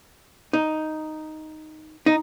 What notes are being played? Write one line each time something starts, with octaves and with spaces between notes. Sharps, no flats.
D#4
D#4